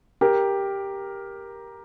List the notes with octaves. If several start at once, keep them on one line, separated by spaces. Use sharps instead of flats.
G4 A#4